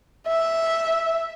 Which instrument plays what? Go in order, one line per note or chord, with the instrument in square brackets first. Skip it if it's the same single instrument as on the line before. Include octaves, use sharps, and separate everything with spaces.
[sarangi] E5